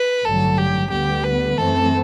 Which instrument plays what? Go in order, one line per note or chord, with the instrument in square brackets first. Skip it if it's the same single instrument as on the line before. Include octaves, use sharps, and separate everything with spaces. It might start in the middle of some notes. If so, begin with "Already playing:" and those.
Already playing: [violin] B4
[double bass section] A1 G2 D3 F#3 [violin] A4
[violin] G4
[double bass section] D2 D3 G3 B3 [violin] G4
[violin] B4
[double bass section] F#2 E3 A3 C4 [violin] A4